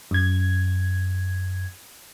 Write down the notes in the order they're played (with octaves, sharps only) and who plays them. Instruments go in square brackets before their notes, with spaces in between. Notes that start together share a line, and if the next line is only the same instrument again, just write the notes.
[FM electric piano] F#2 G#6